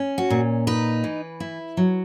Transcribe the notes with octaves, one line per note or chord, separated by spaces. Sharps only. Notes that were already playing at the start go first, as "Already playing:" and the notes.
Already playing: C#4
F#4
A#2
D#4 B4
E3
E4
F#3